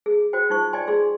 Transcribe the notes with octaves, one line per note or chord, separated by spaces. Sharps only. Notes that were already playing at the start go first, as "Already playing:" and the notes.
G#4
F#4 C5 G5
D#4 F4 C5 C#6
D5 D#5 G5 G#5 C6
G#4 D5 C6